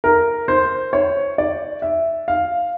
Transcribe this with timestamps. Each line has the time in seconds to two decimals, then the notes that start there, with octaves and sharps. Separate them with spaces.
0.04 A#4
0.48 C5
0.93 C#5
1.38 D5
1.82 E5
2.28 F5